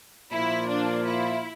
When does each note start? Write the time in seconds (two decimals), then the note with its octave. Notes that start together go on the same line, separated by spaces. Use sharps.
0.32 A#2 F3 A#3 E4 F4
0.69 D4
1.06 E4